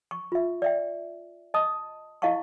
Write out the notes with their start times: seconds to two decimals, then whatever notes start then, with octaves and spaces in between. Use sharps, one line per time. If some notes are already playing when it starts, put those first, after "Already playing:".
0.11 C#6
0.32 F4 E5
0.62 D5 E5 G5
1.54 D#5 A5 D#6
2.22 E4 D#5 F5 A5 C#6